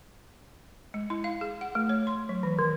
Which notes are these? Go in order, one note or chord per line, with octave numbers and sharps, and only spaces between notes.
G#3
E4
F5
G#4
F#5
A3
C#5
C6
F#3
E3
D#3